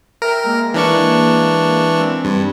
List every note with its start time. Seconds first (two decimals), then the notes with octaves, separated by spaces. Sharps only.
0.22 A#4 E5 G5 A#5
0.44 G#3 A#3
0.74 E3 D4 C#6
1.96 C4
2.25 G2